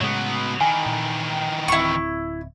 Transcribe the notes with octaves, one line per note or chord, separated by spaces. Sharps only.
A2 C#3 F#3 G#3 B3
D#3 E3 G#5
A#2
D1 C4 E4 C#6